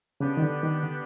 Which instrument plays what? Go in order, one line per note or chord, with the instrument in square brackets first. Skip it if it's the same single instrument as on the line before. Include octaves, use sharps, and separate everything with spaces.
[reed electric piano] C#3 [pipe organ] B3 D4 G4 B4
[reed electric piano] D#3
D3
D#3
D3